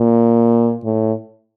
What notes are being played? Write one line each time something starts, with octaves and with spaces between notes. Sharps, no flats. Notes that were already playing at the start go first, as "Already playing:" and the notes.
Already playing: A#2
A2